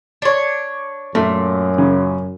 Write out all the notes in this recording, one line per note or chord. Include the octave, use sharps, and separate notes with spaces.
D4 C#5
F#2 A#2 A3
C#3